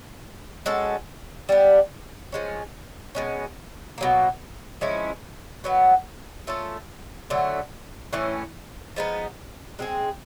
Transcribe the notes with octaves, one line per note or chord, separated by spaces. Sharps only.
G#3 C#4 F#4 A4
G3 B3 D4
F3 G#3 C#4
B2 G#3 C#4
B2 F#3 A#3
F3 G#3 C#4 E4
B2 F#3 B3
A3 C#4 F4 A4
D3 F#3 A3
A2 E3 A3 C#4
F3 G#3 B3 D#4
G#3 C4 F4 G#4